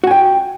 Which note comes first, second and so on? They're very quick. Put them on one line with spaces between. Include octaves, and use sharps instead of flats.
F#4 G#5 G5